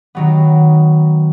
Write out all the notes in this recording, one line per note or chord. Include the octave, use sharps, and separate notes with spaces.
D#3 F#3 B3